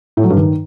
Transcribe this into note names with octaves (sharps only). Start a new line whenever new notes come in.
A2
F#3
G2
D#3